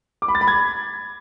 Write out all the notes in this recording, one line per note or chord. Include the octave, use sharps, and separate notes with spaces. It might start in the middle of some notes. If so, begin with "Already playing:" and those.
D6
B5
A6
B5
G#6